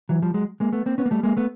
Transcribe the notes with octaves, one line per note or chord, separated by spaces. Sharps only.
E3 F#3
F3 G3
F#3 G#3
G#3 A#3
A3 B3
A#3 C4
B3 C#4
A#3
G3 A3
G#3 A#3
A3 B3